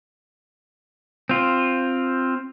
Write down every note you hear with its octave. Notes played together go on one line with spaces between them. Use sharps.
C4 F4